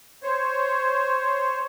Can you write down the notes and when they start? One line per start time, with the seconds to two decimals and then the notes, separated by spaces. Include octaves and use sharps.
0.23 C5 C#5